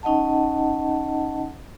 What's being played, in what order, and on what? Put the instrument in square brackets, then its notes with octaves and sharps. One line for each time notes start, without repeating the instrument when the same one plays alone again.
[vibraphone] C#4 D#4 D#5 F#5 A5